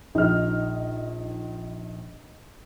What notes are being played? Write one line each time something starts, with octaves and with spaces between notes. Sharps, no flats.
A#1 D#4 F6